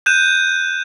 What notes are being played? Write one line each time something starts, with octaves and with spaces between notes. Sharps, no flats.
F#6 G6 D#7 E7